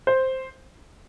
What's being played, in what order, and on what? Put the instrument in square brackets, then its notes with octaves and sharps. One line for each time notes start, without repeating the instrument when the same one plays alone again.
[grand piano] C5